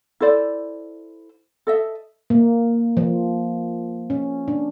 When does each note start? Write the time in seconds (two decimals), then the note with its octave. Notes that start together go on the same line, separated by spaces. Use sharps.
0.20 E4 A4 C5 D5
1.67 A4 D#5 E5
2.30 A#3
2.97 F3
4.10 C#4
4.48 D4